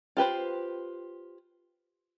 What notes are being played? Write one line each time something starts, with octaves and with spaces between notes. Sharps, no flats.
F4 G4 B4 C5